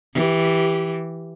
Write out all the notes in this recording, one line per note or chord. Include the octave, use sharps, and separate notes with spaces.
E3 G4